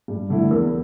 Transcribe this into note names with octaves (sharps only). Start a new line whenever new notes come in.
G2
D3 A3 E4
E2 A#4